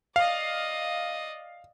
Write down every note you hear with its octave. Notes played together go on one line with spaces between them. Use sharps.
D5 D#5 F5